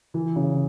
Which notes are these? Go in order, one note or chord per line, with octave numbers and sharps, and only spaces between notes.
E3
C#3